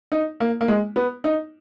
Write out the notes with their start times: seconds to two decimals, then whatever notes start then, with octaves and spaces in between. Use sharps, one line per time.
0.12 D#4
0.40 A#3
0.61 A#3
0.68 G#3
0.96 B3
1.24 D#4